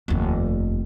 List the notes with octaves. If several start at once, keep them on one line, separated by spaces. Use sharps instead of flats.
F1 D#2